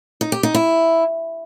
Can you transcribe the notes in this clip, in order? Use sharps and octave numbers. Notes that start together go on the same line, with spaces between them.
D#4
G4
D#4
E4